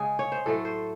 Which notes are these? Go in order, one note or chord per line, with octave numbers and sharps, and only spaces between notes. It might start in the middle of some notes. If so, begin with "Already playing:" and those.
Already playing: C#3 G#3 G#4
C#5
C5
A2 F#3 A3 A4
C5